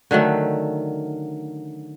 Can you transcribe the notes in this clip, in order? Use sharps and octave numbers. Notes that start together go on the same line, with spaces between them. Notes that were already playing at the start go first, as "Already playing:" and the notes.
D3 D#3 F#3 A3